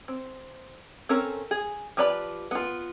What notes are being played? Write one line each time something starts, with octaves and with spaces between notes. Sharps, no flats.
C4
C4 C#4 A4 A#4
G#4
F3 G4 B4 D5 B5
B3 F4